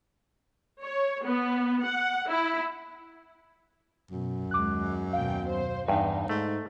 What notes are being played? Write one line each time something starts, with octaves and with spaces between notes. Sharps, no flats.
C#5
B3
F#5
E4
F#2 B2
D#2 G#3 D6 F#6
D#2 B2 F5 G5
C5
E2 G2 D#4
G#2 A3